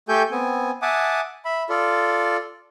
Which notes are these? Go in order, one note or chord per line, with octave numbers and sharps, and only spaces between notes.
A3 G4 A4 G5 G#5 G6
B3 C4 G#5
E5 F#5 G#5 A5 D6 D#6
E5 B5
F4 A4 D5